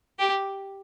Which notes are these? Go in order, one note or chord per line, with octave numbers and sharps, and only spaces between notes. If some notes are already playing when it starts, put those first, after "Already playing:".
G4